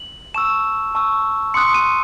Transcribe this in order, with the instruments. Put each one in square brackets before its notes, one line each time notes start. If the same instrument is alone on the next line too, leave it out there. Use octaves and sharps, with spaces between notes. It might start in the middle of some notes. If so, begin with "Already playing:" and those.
Already playing: [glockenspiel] F#7
A5 C#6 E6 E7
A5 C#6 E6
C6 D#6 F#6 C#7
D#7